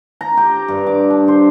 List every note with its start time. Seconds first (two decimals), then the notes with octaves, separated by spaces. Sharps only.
0.21 A#5
0.37 G4
0.68 G2
0.87 D6
1.10 D4
1.28 C5